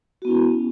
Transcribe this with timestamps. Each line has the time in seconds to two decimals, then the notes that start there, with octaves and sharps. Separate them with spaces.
0.22 F#4
0.25 B3
0.28 E4
0.31 C#4